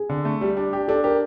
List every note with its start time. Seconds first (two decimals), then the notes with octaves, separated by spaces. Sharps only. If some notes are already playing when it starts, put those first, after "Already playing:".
Already playing: G#4
0.09 D3
0.25 A3
0.41 G3
0.57 D4
0.73 G4
0.88 D4 A4
1.04 G4 A#4